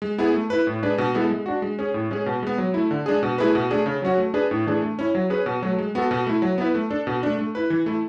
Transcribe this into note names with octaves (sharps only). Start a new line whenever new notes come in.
G#3
B3 E4 G#4
A3
E4 B4
A2
G#3 D4 G#4 B4
B2
G#3 B3 E4 A4
G#3
D4 F#4
G#3
C#4 G#4
A2
G#3 C#4 G#4
B2
G#3 B3
F#3
A3 E4
D3
G#3 D4 G#4
B2
A3 E4 G#4 B4
B2
A3 D4 G#4
C#3
F#3 C#4 F#4
A3
D4 G#4 B4
A2
E3 A3 D4 G#4
A3
C#4 E4
F#3
C#4 G#4 B4
B2
F#3 A3
G#3
B3 F#4 A4
B2
A3 E4
F#3
B3 E4 B4
A3
D4 A4
B2
A3 D4
A3
E4 B4
E3
A3 E4